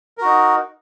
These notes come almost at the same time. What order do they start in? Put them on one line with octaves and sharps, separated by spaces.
A#4 F#4 D#4